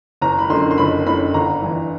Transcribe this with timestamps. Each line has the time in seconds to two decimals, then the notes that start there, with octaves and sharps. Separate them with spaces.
0.22 F#1 A#5
0.39 B5
0.50 D3 C6
0.54 F#2
0.71 C6
0.78 F#1 B5
1.07 F#2 D3 B5
1.34 G1 A#5
1.62 G2 E3